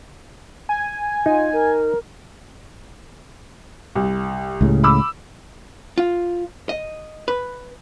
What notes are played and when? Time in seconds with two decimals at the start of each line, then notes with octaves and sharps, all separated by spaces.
0.69 G#5
1.26 D#4 F4
1.53 A#4
3.95 C2
4.61 C#2 A2 C#3
4.84 B5 D6 E6
5.98 F4
6.69 D#5
7.28 B4